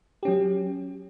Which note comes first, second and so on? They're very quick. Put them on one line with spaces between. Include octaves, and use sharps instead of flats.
G4 C#4 F#3